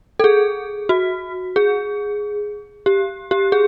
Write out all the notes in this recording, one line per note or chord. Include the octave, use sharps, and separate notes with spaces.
A4
G#4
F#4
G#4
G4
G4
G#4